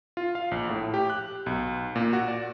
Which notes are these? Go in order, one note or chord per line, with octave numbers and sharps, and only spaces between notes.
F4
F5
A#1
A2
G4
F#6
B1
A#2
F#4
D5